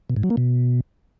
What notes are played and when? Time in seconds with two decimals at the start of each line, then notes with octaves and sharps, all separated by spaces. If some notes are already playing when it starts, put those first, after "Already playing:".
0.10 B2
0.17 G#2
0.23 F#3
0.30 A#3
0.37 B2